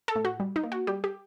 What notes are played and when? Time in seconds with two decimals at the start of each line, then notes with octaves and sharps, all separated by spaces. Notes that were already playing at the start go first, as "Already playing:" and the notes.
0.08 A4
0.16 A2
0.25 F#4
0.40 G3
0.56 D#4
0.63 A#3
0.72 F#4
0.87 G3 G4
1.04 G4